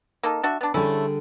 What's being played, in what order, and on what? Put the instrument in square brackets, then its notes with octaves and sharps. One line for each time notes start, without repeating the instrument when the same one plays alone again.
[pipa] A#3 D#4 A4
D4 F#4 E5
B3 D4
[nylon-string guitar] D3 G3 G#4 [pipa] A3 C#4 E4